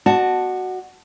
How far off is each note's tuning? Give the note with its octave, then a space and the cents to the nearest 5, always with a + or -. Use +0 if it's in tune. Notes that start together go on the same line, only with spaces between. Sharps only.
F#4 +0 D5 +40 A5 -5